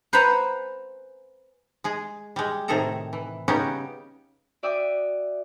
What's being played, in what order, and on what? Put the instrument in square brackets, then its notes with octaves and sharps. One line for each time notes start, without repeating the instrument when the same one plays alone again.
[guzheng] B4 C5 F#5 G#5 A#5 B5
[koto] G#3 G#4
G3 G#3
A2 C3 D#3 G#4 A4 A#5
E3
C#3 G3 B3 C#4 D#4 G4
[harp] F#4 D5 E5 G5 D6 D#6